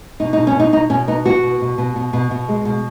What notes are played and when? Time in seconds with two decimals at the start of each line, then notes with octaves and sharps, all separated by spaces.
0.20 B2 D#4
0.33 D#4
0.38 B2
0.47 C#4
0.55 B2 D#4
0.73 B2 D#4
0.90 B2 C#4
1.08 B3 D#4
1.26 B3 F#4
1.43 B2
1.61 B2
1.78 B2
1.96 B2
2.13 B2
2.31 B2
2.49 G#3
2.65 B2